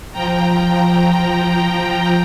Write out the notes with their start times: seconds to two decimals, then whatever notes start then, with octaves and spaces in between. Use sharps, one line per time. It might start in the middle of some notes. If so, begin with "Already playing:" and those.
0.12 F3 G5 A#5